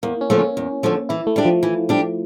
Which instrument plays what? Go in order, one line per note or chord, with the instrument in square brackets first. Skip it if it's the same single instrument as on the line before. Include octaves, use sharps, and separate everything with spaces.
[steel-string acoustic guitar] E2 [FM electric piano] A#3
[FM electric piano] C#4
[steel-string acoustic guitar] D3 F3 A3
[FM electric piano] C#4
[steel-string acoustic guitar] E2
D3 F3 A3
[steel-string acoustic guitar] E3 [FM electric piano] E4
[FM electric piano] A3
[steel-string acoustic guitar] G3 D4 G4
[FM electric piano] F3
[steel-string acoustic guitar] E3
G3 D4 G4